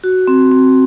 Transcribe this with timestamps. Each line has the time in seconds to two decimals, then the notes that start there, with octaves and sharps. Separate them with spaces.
0.04 F#4
0.28 C4
0.51 C4